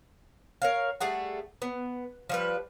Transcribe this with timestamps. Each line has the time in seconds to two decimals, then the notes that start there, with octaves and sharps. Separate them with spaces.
0.62 A#4 C#5 F5
1.00 G3 A3 G#4 F#5
1.62 B3
2.29 F3 G3 B4